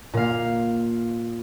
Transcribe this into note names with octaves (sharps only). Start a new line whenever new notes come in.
A#2 F5